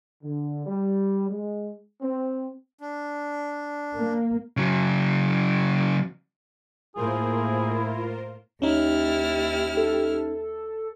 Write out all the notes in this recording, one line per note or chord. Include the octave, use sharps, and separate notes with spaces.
D3
G3
G#3
C4
D4
A#3
C#3 F#3
A2 A#3 E4 F4 G#4 A#4 C5
D#2 C#4 D#4 E4 G4 F6
A4